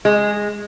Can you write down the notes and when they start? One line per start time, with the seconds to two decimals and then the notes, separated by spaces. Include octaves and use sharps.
0.05 G#3